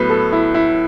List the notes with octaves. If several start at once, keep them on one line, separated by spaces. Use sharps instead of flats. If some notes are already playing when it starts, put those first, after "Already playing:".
Already playing: A2 F#3 B3 B4
A4
E4
E4